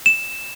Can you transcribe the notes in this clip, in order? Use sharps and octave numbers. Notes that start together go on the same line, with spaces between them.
E7